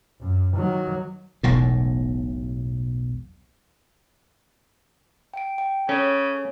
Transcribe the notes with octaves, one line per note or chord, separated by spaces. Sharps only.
F#2
D#3 F#3
E1 B1 A2
G5 D7
G5
C#3 C#4 A4 C#5